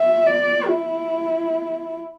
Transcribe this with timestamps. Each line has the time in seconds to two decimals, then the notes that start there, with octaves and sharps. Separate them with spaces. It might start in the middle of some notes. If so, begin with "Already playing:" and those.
Already playing: E5
0.27 D5
0.68 E4